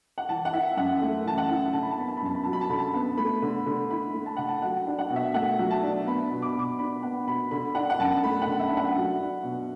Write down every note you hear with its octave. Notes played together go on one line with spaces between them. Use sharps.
F#5
E3 A5
F#5
E4 E5
F#2 F#5
A3
E3 A5
F#5
E4
D3 A5
B5
A5
B3 B5
A5
B5
F#2 A5
B5
F#3 A5
B5
A5
D3 B5
A5
B3
A3 B5
D3
D3
E4 B5
A3
A5
D3 F#5
A5
F#3 F#5
D4
F#5
B2
E5
A3 F#5
F#3
A5
D4
B3 B5
B2
D6
B2 D6
D4 B5
B3 F#5
B2 B5
D3 B5
D4 F#5
F#5
F#2 A5
A3 B5
F#5
D3
E5
D4
F#5
F#3
D4
B2